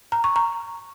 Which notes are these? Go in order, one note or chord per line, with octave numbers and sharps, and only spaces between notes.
A#5
C#6
A#5